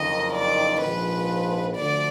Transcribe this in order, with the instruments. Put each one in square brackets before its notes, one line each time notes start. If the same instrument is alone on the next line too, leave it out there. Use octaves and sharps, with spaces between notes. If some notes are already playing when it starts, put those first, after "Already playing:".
Already playing: [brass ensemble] F#1 F2 D#3 [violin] D#5
[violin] D5
[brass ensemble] A#1 G#2 F3 [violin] B4
[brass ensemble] D2 D3 F3 [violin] D5